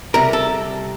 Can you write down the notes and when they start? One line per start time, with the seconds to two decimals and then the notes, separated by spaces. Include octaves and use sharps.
0.14 C3 G3 A#4
0.33 A4